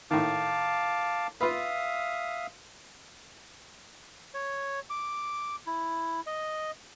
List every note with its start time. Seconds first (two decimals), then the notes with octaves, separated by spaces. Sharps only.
0.11 A2 D#3 F5 A5 D6
1.41 F4 B4 E5 F5 D#6
4.34 C#5
4.90 D6
5.67 E4
6.26 D#5